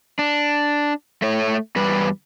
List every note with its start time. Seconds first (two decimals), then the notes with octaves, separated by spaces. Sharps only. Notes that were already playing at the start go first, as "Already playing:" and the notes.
0.19 D4
1.22 A3 C#5
1.76 E2 G3 B4